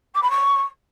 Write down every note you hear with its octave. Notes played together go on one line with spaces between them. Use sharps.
D6
B5
C#6